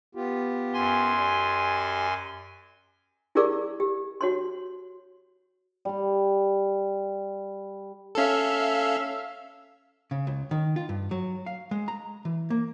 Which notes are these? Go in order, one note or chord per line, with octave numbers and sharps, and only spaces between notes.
B3 F4 G4
F#2 G#5 C6
G4 D5
E4 G4 G#4 A#4 D5 D6
G4
F#4 C#5 C6
G3 C6
C#4 A4 E5 F5
C#3
C#2
D#3
F4
G2
F#3
F5
G#3
A#5
E3
A#3